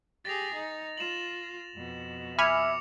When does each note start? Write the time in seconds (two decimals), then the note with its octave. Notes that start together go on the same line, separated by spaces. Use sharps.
0.25 G4 G#4 A6 A#6 F7
0.54 D#4
0.98 F4 E7 F#7
1.75 F2 B2
2.39 E5 G#5 B5 D6 F6 C#7 F7